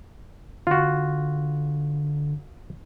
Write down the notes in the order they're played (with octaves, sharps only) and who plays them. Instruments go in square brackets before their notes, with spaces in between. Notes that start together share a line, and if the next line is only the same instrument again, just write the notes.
[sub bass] D3 [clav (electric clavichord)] F4 F#4